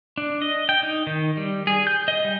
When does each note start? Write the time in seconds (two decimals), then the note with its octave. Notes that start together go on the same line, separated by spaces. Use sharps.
0.18 D4
0.42 D#5
0.69 G5
0.83 D#4
1.07 D#3
1.37 G3
1.67 G#4
1.87 G6
2.08 D#5
2.25 G3